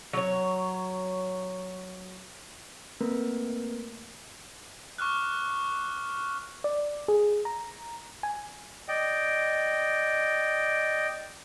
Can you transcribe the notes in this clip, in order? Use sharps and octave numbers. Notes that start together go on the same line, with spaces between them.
F#3 C#5
A3 A#3 C4 A#4 B4
C#6 D6 F6 F#6
D5
G#4
A#5
G#5
D5 D#5 G5